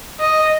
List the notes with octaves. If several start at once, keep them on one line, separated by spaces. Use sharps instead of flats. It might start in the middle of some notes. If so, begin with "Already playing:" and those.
D#5